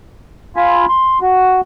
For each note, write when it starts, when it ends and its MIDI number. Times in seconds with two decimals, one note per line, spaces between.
0.56 0.86 65
0.56 0.86 80
0.56 0.86 83
0.89 1.19 84
1.22 1.61 66